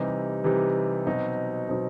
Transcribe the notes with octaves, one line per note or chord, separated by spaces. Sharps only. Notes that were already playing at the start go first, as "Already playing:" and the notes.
Already playing: C3 E3 G3 D#4
C3 E3 G3 D#4
B2 F#3 C4 D#4
B2 F#3 C4 D#4